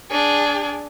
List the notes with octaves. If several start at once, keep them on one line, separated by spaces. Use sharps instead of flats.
D4 G#4